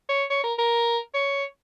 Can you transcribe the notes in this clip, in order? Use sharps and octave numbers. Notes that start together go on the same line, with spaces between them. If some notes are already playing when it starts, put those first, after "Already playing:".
C#5
C#5
A#4
A#4
C#5